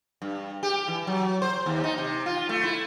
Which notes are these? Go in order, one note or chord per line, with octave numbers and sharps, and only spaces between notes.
G2
G4
E3
F#3
C5
D#2
D#4
C3
F4
A3
E4